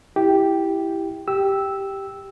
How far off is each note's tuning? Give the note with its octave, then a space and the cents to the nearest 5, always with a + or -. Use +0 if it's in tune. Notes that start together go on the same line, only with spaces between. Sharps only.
E4 +0 G4 +0
G4 +0 E6 -5